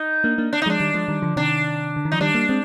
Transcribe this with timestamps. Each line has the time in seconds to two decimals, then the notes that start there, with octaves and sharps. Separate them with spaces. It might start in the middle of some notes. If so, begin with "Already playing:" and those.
Already playing: D#4
0.24 A#3 D4
0.38 A#3 D4
0.53 D4
0.62 D#4
0.66 F3 G#3 D4
0.80 D#3 G3
0.94 F3 G#3
1.08 D#3 G3
1.22 D3 F3
1.36 C3 D#3 D4
1.96 D3
2.05 D#3
2.12 F3 D#4
2.20 D#3 G3 D4
2.35 G3 A#3
2.49 G#3 C4